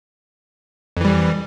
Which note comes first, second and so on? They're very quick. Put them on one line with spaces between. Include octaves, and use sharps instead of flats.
F2 E3 G3